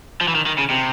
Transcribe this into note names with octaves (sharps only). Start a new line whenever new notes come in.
F3
E3
D#3
D#3
C#3
C3